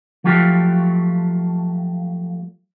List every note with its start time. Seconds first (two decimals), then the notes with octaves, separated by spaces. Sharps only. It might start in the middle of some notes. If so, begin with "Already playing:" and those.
0.24 F3 F#3 A3 F4 G4